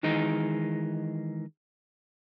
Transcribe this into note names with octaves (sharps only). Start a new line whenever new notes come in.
D#3 E3 G#3 D#4